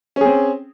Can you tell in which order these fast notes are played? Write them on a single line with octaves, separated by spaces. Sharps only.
C#4 G#4 C4